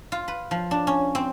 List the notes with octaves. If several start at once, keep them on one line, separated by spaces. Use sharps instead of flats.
F4
B4
F3
D4
C#4
C4